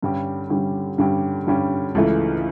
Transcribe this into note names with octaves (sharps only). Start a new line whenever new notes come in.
G2 D3 G3 C#4 G4
G2 D3 G3 C#4 G4
G2 D3 G3 C#4 G4
G2 D3 G3 C#4 G4
C#2 C#3 E3 A3